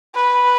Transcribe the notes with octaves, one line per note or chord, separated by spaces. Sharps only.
B4